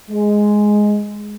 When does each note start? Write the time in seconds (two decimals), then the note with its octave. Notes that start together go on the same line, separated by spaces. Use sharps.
0.11 G#3